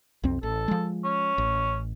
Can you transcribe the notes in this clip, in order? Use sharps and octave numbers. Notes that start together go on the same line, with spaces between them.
B1 F2 C4
A1 A4
F3 G#3
C#4
A1